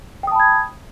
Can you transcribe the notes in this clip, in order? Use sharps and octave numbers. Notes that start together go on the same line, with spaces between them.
G5 A5 B5 D#6 G#6